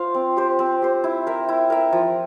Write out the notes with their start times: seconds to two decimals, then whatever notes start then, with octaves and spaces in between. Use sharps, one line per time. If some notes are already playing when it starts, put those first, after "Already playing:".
Already playing: F4 C5 F5
0.14 C4
0.37 G4 C5
0.59 C4
0.82 G4 C5
1.04 E4
1.27 A#4 E5
1.49 E4
1.70 A#4 E5
1.93 F3